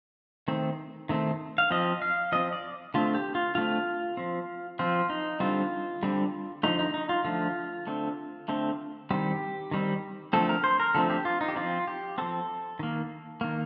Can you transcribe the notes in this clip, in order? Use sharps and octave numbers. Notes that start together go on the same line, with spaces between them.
D#3 A3 C4
D#3 A3 C4
F5
F3 C4 D#5
F5
F3 C4 D#5
D5
D3 A3 C4 F4
G4
F4
D3 A3 C4 F4
F3 C4
F3 C4 F4
D#4
D3 G3 C4 F4
D3 G3 C4
D3 F3 A3 D#4
D#4
D#4
F4
D3 F3 A3 F4
D3 A3 C4
D3 A3 C4
D#3 G3 C4 G4
D#3 G3 C4
D3 F3 A3 C4 A4
A#4
C5
A#4
D3 F3 A3 C4 A4
G4
F4
D#4
G4
F3 C4 F4
G4
F3 C4 A4
D#3 A#3
D#3 A#3